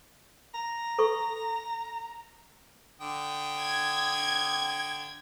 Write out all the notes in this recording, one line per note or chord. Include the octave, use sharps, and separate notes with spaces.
A#5
A4 B4 C#6
D3 G5 D#6
G#6